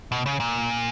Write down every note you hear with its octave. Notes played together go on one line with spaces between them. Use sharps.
B2
C#3
A#2